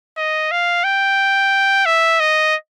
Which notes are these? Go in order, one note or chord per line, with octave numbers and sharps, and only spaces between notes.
D#5
F5
G5
E5
D#5